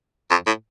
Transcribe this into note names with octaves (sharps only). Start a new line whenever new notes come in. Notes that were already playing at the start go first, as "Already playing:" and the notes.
F2
A2